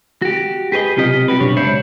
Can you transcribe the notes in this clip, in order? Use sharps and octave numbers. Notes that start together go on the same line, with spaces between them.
F#4 G4
G4 G#4 B4 C#5 D#5
B1 C3 F4 G4 A4 D#5
C2 F#4 G4 B4
F#2 B2 D4 C#5
C#2 D4 C5 C#5 E5 B5